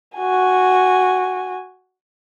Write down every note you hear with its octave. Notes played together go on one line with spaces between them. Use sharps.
F#4 G#5